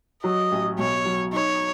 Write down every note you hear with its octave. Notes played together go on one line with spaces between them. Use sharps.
F#3 D#5
A1
B1 C#5
F#3
D#4 C#5